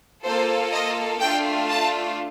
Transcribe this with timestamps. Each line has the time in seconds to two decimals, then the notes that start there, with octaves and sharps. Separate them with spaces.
0.24 A#3 F4 A4 C5
0.73 D#5
1.20 A3 D4 F4 G5
1.69 A5